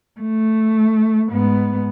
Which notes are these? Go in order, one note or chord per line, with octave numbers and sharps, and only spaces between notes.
A3
G#2 B3